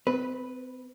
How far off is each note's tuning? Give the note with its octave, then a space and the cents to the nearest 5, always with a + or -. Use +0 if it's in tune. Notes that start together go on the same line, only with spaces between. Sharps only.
C4 -40 B4 +0